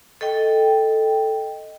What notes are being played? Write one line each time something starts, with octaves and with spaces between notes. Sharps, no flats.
A4 D#5 G5